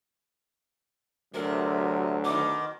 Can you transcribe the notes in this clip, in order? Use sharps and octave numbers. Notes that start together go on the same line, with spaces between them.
D2 C3 F#3 A#4
B2 D#3 D6